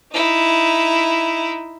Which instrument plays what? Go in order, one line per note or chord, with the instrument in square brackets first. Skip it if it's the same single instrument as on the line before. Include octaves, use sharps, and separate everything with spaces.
[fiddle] D#4 E4